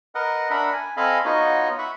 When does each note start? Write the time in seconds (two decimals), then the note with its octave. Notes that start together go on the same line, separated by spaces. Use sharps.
0.15 A#4 B4 D#5 F#5
0.50 D4 A#4 E5 F#5 B5
0.73 G#5
0.97 C4 A4 D#5 F5 G#5 B5
1.25 B3 D#4 F4 F#4 C#5 D#5
1.79 E5 F#5 B5 C#6